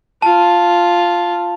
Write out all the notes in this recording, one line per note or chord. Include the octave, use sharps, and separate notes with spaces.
F4 A5